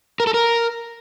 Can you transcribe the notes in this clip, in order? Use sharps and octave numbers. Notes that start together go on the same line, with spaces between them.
A#4
A4
A#4